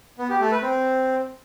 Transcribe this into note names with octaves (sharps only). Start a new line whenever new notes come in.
B3
G4
A3
B4
C4